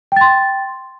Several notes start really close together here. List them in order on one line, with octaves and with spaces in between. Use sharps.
G5 A6 C6